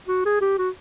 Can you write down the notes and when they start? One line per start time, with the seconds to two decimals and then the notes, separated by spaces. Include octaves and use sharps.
0.08 F#4
0.25 G#4
0.41 G4
0.58 F#4